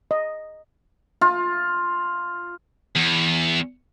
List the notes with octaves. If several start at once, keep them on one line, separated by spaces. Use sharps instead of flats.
D#5
F4
E2